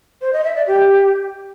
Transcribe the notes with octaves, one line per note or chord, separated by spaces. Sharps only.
C5
D#5
E5
D5
G4